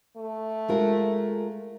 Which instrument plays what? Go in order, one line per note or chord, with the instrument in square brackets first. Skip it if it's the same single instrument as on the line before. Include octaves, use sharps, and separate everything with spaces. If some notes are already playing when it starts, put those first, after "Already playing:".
[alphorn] A3
[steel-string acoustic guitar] G#3 F4 A#4